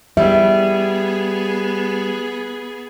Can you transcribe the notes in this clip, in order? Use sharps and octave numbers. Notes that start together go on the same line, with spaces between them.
G3 B3 G#4 E5